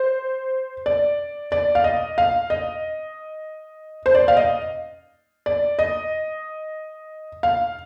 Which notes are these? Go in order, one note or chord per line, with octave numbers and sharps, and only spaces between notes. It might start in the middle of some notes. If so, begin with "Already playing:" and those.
Already playing: C5
D5
D5
F5
D#5
F5
D#5
C5
D5
F5
D#5
D5
D#5
F5